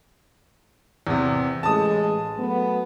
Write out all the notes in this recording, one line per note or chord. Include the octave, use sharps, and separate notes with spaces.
E2 C3
A1 G#3 A5 D#6
F#3 A3 B3